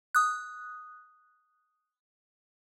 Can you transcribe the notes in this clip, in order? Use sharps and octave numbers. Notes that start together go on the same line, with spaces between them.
D#6 F#6